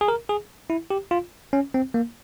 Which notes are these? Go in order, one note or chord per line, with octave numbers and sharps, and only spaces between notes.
G#4
A#4
G#4
E4
G4
F4
C#4
C4
A#3